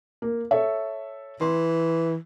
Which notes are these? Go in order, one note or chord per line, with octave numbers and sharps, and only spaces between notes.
A#3
A4 C#5 E5
E3 C6